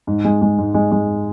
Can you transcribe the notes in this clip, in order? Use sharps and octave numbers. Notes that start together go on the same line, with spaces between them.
G#2
G#3
G#3
G#2
G#3
G#3